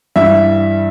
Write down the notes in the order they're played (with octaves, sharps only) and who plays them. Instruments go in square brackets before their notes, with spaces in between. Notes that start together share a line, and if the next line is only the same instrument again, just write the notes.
[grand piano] G2 E3 G3 E5